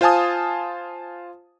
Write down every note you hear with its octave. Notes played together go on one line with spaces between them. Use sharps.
F4 C5 F5 G#5 A5 D#6